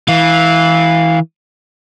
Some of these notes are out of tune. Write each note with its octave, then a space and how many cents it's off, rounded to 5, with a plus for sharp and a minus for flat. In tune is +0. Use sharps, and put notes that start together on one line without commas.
E3 -15 F5 +0